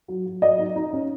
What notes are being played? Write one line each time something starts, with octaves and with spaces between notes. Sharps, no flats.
F#3
F#3
F#3 D#5
D#4
D#4
C#4